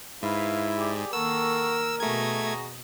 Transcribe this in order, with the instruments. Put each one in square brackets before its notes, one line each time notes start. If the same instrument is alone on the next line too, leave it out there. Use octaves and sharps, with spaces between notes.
[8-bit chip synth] G#2 [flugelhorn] E4 [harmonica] B4 F5
[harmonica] G4 G#4 D5
[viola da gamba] D#3 A#3 [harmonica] A4 F#5 C#6 [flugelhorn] A#4 [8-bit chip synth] E6
[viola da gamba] B2 D#5 [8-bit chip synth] A3 G#6 [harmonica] F#4 G#4 A#5